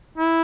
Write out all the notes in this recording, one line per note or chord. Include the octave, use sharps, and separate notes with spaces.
E4